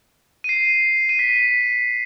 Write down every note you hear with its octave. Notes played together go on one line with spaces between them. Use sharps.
D#7
C7
D#7
B6
B6